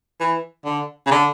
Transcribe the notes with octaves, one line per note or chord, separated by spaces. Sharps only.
E3
D3
C#3
D3